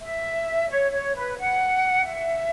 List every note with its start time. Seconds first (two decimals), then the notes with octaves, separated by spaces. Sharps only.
0.02 E5
0.70 C#5
0.92 C#5
1.15 B4
1.37 F#5
2.05 E5